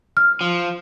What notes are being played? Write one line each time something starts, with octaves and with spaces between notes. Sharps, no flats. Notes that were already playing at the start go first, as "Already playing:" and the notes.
F6
F3